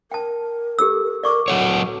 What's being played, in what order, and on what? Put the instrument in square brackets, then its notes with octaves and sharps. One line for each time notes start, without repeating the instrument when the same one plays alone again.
[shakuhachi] A#4 [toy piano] G5 A5
[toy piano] G4 A4 E6
[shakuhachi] A#4 [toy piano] D5 C#6 D6
[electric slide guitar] F#3 A4 C#5 [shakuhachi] F#5